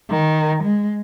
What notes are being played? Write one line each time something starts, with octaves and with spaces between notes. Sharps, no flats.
D#3
G#3